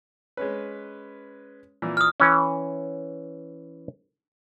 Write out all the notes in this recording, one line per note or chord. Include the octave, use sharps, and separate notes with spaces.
G#3 C#4 B4
A#2 E3
D#6 F6
E3 C#4